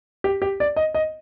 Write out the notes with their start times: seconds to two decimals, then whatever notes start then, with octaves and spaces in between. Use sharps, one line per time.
0.24 G4
0.42 G4
0.60 D5
0.76 D#5
0.95 D#5